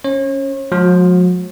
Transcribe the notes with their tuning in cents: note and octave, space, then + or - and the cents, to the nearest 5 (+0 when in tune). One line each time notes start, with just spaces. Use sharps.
C#4 +0 C#5 -40
F3 +45 G#3 +35 F#4 -35